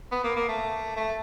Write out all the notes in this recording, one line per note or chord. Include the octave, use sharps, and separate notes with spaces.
B3
A#3
A#3
A3
A3